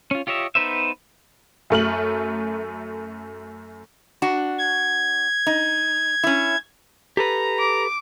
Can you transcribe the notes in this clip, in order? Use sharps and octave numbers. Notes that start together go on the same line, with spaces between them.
C#4 F4
F4 G4 C#5 D#5 E5
B3 D#4 B4 C5 E5
F#2 A3 F6 F#7
D4 F#4
G#6
D#4
C#4 E4
G4 A4 B4 A#5
D6